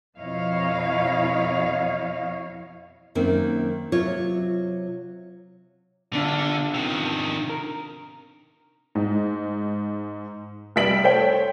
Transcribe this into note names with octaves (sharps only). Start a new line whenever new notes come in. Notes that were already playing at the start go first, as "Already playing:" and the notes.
F2 B2 E4 C#5 D#5 F5
F#2 D#3 A#3 C4
C3 F#3 F4 C#5
D3 B3 D4 F4
C3 D#3
A#4
G#2
F1 G3 E5 B6 D7 F#7
A4 C5 C#5 G5